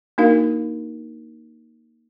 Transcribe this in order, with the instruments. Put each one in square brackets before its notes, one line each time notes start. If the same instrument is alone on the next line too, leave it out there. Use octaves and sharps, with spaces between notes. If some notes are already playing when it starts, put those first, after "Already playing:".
[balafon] A#3 D4 D#4 F#4 A#4 F5